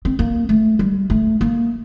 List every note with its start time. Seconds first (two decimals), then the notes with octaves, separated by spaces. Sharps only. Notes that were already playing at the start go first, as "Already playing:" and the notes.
0.05 C4
0.19 A#3
0.49 A3
0.79 G3
1.10 A3
1.41 A#3